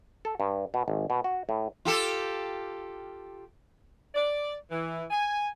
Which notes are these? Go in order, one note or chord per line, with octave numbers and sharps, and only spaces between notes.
A4
G2
B2
G#1
B2
F#4
A2
F4 G4 A4
D5
E3
G#5